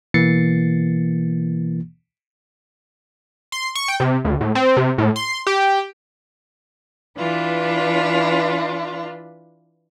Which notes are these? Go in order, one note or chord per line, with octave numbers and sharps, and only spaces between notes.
B2 E3 A#3 A6 C7 C#7
C6
C#6
G5
C3
D2
A2
C4
C3
A2
C6
G4
E3 D4 F4 B4